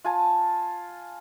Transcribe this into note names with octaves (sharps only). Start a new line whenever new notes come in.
F4 G#5 A5